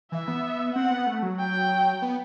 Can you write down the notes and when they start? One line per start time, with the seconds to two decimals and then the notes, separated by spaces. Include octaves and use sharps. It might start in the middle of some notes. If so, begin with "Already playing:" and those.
0.12 E3 E5
0.28 B3
0.75 C4 F#5
0.91 B3
1.07 A3
1.23 F#3
1.39 G5
2.02 B3